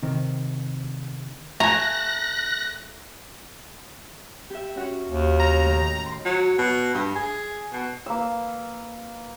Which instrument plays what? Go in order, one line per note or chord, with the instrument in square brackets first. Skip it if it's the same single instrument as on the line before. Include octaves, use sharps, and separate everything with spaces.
[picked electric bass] C3 D#3 C4
[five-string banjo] A3 G#5 [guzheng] A#5 [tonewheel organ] F#6 A#6
[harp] G4 E5
C#4 F#4 C#5
[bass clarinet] D#2
[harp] C#3 F6 [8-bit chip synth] A#5
[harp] A2 D#3
C6
[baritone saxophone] F#3
B2
G2
G#4
B2
[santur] A#3 B4 E6